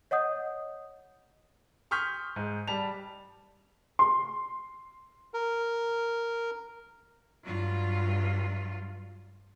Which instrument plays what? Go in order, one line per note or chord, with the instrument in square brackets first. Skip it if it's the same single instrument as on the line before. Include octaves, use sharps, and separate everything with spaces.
[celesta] C#5 D#5 F#5 D#6 G6
[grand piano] C6 C#6 D#6 F6 G6 B6
G#2
G3 A5 F7
[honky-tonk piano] C6
[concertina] A#4
[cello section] G2 F#3 F4